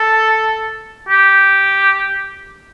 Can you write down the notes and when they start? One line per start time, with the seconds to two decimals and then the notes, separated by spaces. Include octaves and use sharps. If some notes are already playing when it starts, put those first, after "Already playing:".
Already playing: A4
1.09 G4